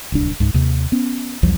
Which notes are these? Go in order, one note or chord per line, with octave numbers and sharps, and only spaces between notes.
D1 C2 D4
C#2 G#2
D#2 C3
B3 C#4
B1 E2 F3 G3